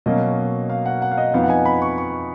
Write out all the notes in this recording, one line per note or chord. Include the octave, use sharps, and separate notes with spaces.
B2 F#3 A#3 C#4 D#5
F5
F#5
F#5
F5
D#5
F2 F3 B3 D#4 F5
F#5
G#5
B5
C#6
C#6